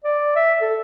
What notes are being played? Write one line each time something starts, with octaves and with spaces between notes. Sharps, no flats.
D5
E5
A4